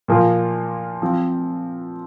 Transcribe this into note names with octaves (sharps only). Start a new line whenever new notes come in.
A#2 F3 A#3 F4
F3 C4